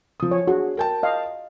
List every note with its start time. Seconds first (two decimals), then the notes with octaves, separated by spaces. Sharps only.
0.20 F3 D#6
0.31 C#5
0.47 D4 F#4 G#4
0.77 A#4 G5 A5
1.03 D#5 F5